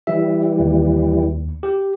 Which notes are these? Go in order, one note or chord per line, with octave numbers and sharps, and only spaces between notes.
E3 G3 E5
D#2
G4